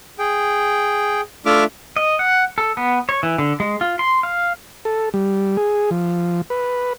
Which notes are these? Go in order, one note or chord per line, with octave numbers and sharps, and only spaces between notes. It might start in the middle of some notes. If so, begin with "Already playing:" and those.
G#4 G5
A3 D4 F4 E5 D6 F6
D#5
F#5
A4
B3
C#5
E3
D3
G#3
F4
C6
F5
A4
G3
G#4
F3
B4